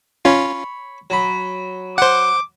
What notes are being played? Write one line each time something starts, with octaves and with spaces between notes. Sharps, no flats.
C#4 F4 C#5 B5
F#3 B5
C5 F#5 D6